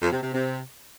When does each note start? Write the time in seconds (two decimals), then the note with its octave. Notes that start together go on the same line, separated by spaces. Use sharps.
0.02 F2
0.12 C3
0.23 C3
0.33 C3